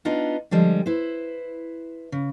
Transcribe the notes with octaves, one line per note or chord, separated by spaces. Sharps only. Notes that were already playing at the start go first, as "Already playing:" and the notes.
B3 D4 D#4 F4
D3 F3 G3 G#3
E4 B4 C5
C#3